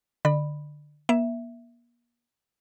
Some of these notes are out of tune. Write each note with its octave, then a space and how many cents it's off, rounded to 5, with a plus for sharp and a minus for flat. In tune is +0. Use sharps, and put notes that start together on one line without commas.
D3 +10 D5 +35 B5 +0
A#3 +40 E5 +5